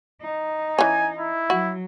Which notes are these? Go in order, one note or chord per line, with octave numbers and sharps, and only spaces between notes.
D#4
E3 C#4 G#5
E4
F#3 F#4